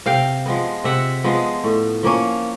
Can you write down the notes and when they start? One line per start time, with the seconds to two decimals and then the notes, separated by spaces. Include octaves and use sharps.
0.06 C3 F5 G5
0.46 F3 G#3 B3
0.84 C3 E5 F#5
1.24 F3 G#3 B3
1.64 A2
2.03 F3 A#3 C#4